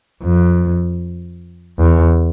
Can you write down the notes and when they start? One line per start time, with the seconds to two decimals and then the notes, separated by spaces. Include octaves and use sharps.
0.23 F2
1.79 E2